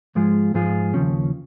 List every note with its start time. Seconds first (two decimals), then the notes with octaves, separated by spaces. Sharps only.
0.15 G#2 F3 G#3 F4 G#4
0.54 G#2 F3 G#3 F4 G#4
0.94 D#2 C#3 F3 C#4